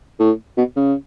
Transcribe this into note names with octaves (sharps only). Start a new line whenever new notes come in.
A2
B2
C#3